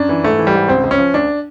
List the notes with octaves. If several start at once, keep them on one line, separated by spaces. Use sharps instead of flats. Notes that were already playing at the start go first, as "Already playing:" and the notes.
Already playing: F#2 D4
E3
G#2 A3
E3
G3
G#2
C#2 C4
C#2
C#4
F3
D2 D4